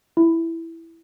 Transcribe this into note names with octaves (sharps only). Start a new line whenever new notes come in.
E4